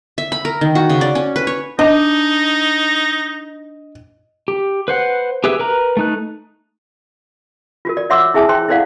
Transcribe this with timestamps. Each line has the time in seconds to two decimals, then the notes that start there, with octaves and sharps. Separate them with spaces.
0.18 E5
0.32 B5
0.45 A#4
0.61 D#3
0.75 F#4
0.90 C#3
1.01 D5
1.15 C#4
1.36 B4
1.47 C#5
1.79 D4 D#4 D#5
4.48 G4
4.88 B4 C5 F#5
5.44 G4 G#4 B4 E5 E6
5.59 A#4 B4 A#5
5.97 A3 D#4 F#6
7.85 F4 F#4 A#4
7.97 A#4 D5
8.10 C#5 E5 F#5 C6 D6 E6
8.34 E4 G#4 E5 G#5 A5 D#6
8.49 C5 G5 C6
8.68 E4 A4 C5 D5 F5 F#5